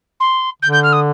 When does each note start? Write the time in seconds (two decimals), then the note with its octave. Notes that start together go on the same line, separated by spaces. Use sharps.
0.20 C6
0.62 D3 G6
0.72 G6
0.83 F6
0.93 D#6